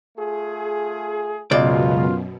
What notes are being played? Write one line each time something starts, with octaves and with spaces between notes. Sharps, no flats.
A3 F4 G#4
C#2 F#2 B2 F4 D5